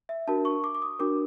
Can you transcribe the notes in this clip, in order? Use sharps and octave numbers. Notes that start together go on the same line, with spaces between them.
E5
D4 F#4 A#4 A5
C#6
D6
D6
D#6
D4 F#4 A#4 D6